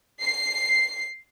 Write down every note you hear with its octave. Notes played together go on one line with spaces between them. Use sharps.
C7